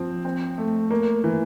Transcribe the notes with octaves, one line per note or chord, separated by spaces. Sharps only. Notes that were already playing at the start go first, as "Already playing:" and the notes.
Already playing: F3 C4
C4
A3
A#3
E3